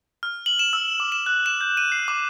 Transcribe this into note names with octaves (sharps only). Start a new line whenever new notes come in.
F6
F#7
E7
E6
D6
E7
F#6
E7
G6
D#7
C7
D6